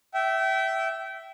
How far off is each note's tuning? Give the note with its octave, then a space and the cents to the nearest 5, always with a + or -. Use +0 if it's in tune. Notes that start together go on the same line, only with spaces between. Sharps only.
E5 +0 G5 -30